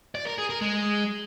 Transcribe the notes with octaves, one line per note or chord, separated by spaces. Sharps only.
D5
A#4
G#4
A#4
G#3